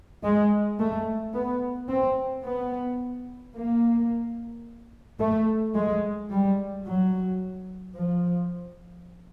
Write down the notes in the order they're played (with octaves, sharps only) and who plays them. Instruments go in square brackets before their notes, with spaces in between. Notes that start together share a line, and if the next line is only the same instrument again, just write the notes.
[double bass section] G#3
A3
B3
C4
B3
A#3
A3
G#3
G3
F#3
F3